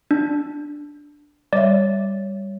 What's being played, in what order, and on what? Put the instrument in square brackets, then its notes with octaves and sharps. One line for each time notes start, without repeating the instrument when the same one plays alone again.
[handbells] D4
[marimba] G3 C#5 E5 [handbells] D5